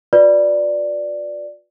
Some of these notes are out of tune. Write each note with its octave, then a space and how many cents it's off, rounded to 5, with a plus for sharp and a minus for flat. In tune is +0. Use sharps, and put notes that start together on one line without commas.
F4 +45 B4 +0 D5 +0